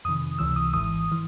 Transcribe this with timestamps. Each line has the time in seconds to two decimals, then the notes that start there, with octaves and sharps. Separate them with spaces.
0.05 F2 C3 D#3 D#6
0.39 C#2 C3 E3 E6
0.56 D#6
0.73 G#1 G#2 E3 D#6
1.12 E3